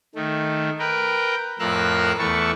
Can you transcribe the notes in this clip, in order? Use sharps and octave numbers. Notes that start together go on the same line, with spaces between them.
D#3 A3
A#4 B4 G5
F2 A2 A#4 F5 E6 F#6
E2 A3 E4 A5 C#6